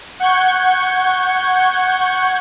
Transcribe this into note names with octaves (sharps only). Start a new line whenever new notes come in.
F#5 C#6 G6 G#6